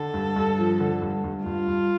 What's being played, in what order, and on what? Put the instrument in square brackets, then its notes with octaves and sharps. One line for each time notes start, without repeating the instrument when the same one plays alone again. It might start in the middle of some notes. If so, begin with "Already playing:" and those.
Already playing: [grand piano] D3 [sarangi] A4
[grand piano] G2
G2
F3
D3
G2
G2
[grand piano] G2 [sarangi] F4
[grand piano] G2